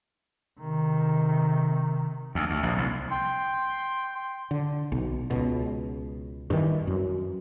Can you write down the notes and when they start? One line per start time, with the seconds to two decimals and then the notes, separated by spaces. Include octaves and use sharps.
0.60 C3 D#3
2.35 D2
2.50 D2
2.63 A#1
2.78 C2
3.11 G5 C6
4.51 D3
4.92 B1
5.30 C#2 B2
6.50 G2 D#3 E3
6.87 F#2